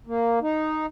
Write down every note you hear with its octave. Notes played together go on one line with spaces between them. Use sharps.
A#3
D#4